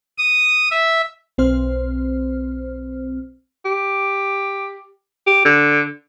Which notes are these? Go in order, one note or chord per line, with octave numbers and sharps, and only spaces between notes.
D#6
E5
B1 C4 C5 F6
G4
G4
D3